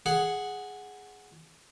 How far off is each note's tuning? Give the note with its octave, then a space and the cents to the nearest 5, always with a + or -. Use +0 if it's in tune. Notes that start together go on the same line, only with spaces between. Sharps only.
G#4 +0 F#5 +0